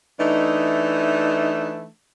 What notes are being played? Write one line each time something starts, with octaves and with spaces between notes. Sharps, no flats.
E3 A3 D4 D#4